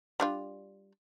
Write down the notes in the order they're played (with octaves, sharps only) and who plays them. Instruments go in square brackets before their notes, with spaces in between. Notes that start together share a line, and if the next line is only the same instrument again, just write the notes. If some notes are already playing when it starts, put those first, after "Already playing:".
[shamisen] G3 D4 F4